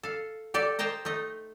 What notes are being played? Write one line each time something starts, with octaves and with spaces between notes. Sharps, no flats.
A4 F5
G4 A4 D5
C5 D#5 G5 A5 A#5
A3 D#4 D#5